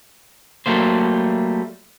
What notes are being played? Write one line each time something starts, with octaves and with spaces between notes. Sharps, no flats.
F#3 G3 A3 A#3 C5